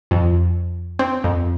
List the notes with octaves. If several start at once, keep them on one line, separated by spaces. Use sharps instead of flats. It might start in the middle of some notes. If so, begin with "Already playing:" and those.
F2
C4
F2